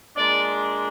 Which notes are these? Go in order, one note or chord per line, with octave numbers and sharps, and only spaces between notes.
A#2 G#3 D4 D5